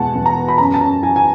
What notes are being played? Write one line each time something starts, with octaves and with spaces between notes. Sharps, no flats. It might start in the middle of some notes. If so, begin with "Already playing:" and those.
Already playing: E2 B2 G#3 B3 F#5 A5
E2
A#5
B3
B5
F#2 A#5
A5
F#2 A#5
E3 G#5
G#5